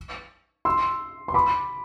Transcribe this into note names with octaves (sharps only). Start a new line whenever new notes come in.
C6 E6
C6
B5 D6